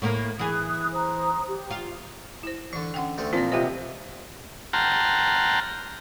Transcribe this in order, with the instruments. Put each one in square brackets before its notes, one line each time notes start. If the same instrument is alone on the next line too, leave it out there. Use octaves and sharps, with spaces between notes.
[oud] A2 A#3 A#4
[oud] E3 G#4 [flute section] D#6 F#6
[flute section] C5 A#5 D#6
G4
[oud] F4
[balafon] E4 C5
[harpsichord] D3 C#6 [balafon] E3
[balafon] C#4 F#5 G5
[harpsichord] D2 A3 C4
[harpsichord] A#2 [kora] F3 [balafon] C4 C5
[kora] C3 B3 D#5 [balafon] F4 G4 C5
[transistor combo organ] F#5 G5 A5 A#5 C6 F6